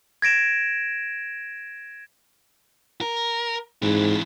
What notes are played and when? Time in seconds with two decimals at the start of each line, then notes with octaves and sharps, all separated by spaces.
0.22 G#6 A#6 D7 E7
3.01 A#4
3.82 G#2 E3 C4